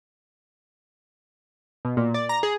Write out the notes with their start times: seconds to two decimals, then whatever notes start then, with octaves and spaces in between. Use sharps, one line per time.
1.85 B2
1.97 A#2
2.14 D5
2.29 A#5
2.43 G#4